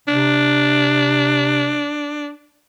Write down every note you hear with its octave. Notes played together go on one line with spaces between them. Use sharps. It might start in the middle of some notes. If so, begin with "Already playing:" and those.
C3 D4